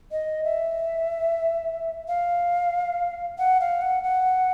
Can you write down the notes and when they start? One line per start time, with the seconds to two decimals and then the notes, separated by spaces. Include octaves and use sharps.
0.12 D#5
0.44 E5
2.08 F5
3.38 F#5
3.60 F5
3.82 F#5
4.04 F#5